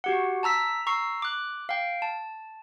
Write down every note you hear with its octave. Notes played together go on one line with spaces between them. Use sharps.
F#4 G4 F#5
A5 A#5 E6 B6
A#5 C#6 E6 C7
D6 F#6
F5 G5
A5